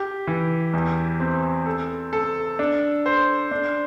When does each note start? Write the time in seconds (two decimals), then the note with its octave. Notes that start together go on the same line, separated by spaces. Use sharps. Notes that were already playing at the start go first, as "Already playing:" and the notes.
Already playing: G4
0.27 E3
0.73 E2
1.20 C4
1.66 A4
2.13 A4
2.59 D4
3.06 C5
3.51 D4